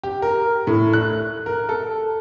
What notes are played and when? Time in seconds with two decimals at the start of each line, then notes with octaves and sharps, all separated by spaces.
0.04 G4
0.22 A#4
0.67 A2
0.93 F#6
1.46 A#4
1.69 A4